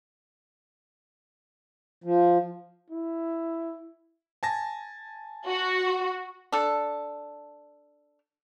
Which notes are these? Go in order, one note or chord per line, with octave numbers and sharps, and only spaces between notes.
F3
E4
G#5 A5 A#6
F#4
D4 A4